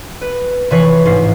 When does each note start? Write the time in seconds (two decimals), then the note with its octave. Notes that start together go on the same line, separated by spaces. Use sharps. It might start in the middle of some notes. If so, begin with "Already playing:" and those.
0.21 B4
0.71 F1 E3 B4 C#5 C#6 C7
1.05 A1 G#2 C7